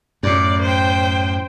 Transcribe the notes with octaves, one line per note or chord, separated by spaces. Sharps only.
F#2 A2 D5
C5 G5